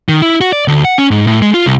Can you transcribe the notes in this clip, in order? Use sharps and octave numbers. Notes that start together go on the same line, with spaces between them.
D#3
E4
F#4
D5
D2
F#5
C#4
G#2
A2
G#3
F4
C2